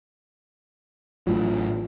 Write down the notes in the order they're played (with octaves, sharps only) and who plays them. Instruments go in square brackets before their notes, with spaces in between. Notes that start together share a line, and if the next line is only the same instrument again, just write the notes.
[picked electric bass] A1 A2 F#3 [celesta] F4